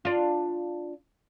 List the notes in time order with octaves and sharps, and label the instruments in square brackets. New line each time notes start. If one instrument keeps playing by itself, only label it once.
[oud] D4 F4